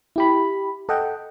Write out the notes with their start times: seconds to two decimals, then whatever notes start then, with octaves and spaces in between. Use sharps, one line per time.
0.16 E4 G4 B5
0.89 A4 D#5 F#5 G5